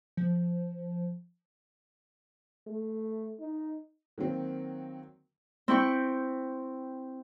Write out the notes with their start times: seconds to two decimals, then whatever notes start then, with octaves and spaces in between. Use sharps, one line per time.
0.17 F3
2.67 A3
3.40 D#4
4.18 D#3 F#3 A#3 C4
5.68 C4 E4 G5 C#6